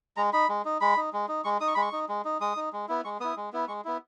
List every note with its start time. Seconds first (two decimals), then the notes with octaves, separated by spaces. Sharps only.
0.17 G#3 A#5
0.33 D#4 B5
0.49 G#3
0.65 D#4
0.81 G#3 B5
0.97 D#4
1.13 G#3
1.29 D#4
1.44 G#3 C#6
1.61 D#4 D#6
1.68 C#6
1.75 G#3 B5
1.82 C#6
1.93 D#4
2.09 G#3
2.25 D#4
2.40 G#3 D#6
2.57 D#4
2.73 G#3
2.88 B3 E4
3.05 G#3 C#6
3.20 B3 E4 D#6
3.37 G#3
3.53 B3 E4
3.68 G#3 C#6
3.85 B3 E4